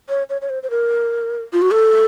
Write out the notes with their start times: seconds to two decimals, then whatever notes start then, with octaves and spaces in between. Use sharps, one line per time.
0.09 C#5
0.30 C#5
0.42 C#5
0.50 C5
0.63 C5
0.70 A#4
1.53 F4
1.62 F#4
1.71 A4